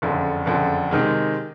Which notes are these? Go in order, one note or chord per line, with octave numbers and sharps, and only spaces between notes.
F#1 F2 D3
F#1 F2 D3
C3 D#3 G#3